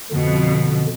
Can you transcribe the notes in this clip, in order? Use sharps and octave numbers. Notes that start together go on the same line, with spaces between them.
F2 B2 D3